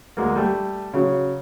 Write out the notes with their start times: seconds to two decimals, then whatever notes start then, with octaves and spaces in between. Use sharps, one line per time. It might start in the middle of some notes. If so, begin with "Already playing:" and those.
0.17 D2 G#3 A#3
0.36 G3 A3
0.94 C#3 F#3